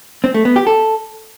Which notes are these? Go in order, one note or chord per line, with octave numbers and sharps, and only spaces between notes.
C4
A3
B3
G4
A4